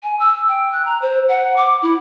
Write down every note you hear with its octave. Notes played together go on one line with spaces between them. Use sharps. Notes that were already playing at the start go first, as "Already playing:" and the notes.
G#5
E6
G5
F#6
A#5
C5
F#5
D6
E4